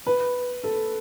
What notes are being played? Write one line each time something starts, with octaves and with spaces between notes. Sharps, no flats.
B4
A4